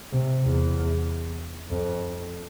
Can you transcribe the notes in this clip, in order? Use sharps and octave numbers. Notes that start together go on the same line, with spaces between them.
C3
E2
F2